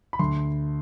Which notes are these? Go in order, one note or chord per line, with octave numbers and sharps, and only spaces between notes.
B5
D2 D3 C6